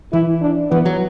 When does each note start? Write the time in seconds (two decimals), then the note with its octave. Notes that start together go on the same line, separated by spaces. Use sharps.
0.13 E3 E4
0.41 D4
0.71 E3 B3
0.85 F#3